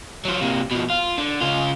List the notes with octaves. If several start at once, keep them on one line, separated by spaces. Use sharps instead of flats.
F#3 F4
C3 A#3
B2 F3
F4
D3
C#3 F4